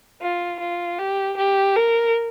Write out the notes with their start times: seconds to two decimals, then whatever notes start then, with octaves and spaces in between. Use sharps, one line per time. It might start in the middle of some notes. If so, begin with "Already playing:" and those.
0.21 F4
0.60 F4
0.99 G4
1.37 G4
1.76 A#4